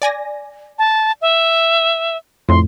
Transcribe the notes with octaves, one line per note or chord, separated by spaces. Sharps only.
D5 G#5 A#6
A5
E5
F2 A2 C6